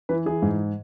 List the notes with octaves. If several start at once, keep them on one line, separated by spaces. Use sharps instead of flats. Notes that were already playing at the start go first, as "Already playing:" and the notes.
E3 B4
E3 G#4
G#2